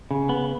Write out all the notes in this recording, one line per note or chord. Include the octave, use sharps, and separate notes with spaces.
C#3
B3